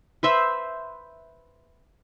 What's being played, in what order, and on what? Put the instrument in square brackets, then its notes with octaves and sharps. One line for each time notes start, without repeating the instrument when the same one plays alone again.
[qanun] B4 C5 E5